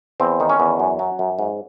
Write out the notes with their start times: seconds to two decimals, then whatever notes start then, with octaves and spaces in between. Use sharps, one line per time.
0.20 E2 C4
0.40 D#3 D#4
0.50 C#4
0.60 E2
0.80 F#2
0.99 F#3
1.19 F#2
1.39 G#2